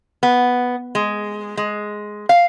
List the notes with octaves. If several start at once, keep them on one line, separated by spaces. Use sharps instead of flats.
B3
G#3
G#3
F5